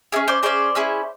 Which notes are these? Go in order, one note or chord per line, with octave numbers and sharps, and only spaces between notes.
C#4 E4 G#4
C5 D5
C#4 E4 G#4 C5 D5
C#4 E4 G#4